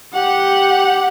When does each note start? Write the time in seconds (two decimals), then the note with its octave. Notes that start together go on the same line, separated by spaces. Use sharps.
0.13 G4 F#5